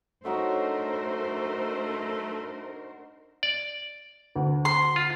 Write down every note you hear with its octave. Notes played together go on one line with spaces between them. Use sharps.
A3 D4 D#4 F#4 A#4 C5 C#5
D5
D2
C6
F4